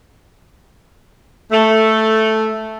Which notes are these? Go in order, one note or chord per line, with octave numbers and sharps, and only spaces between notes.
A3